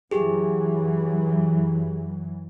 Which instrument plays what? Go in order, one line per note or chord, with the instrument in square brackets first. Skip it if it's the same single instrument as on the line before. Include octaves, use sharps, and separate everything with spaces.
[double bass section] F#2 E3 F#3 [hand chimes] G4 G#4